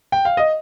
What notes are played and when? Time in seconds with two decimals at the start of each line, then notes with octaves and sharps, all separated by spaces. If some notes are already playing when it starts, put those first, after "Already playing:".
0.12 G5
0.25 F5
0.37 D#5